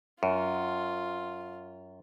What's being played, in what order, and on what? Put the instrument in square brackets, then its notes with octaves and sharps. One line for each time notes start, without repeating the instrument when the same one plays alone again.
[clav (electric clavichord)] F#2 [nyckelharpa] F4